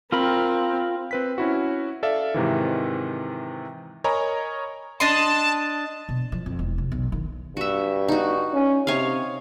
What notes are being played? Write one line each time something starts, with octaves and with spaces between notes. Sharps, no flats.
C4 F4 A#4 B5
C4 B4 B6
C#4 E4 F#4
A4 D5 E5 F5
G#2 C3 D#3 E3
A#4 C#5 D#5 G#5 A#5 B5
D4 D#5 A5 C6
B2
F3
F2
E1
C3
B1
D#3
G2 F#4 E5
D#4 F#4
C#4
C3 C#5 D#5 F5